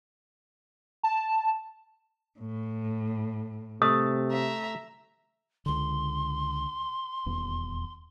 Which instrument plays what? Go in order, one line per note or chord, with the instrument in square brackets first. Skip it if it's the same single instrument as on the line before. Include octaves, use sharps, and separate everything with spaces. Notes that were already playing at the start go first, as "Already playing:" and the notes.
[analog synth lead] A5
[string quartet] A2
[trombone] C3 [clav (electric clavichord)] A3 [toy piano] D#6
[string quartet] E5 A#5
[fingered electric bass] C#2 D3 [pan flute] C6
[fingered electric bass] D#1 E2